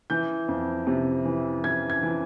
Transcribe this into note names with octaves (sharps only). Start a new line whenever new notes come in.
E3 G6
F2
C3
E3
E3 G#6
G#6
E3